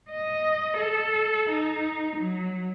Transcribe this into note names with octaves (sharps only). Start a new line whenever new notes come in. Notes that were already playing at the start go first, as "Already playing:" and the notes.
D#5
A4
D#4
F#3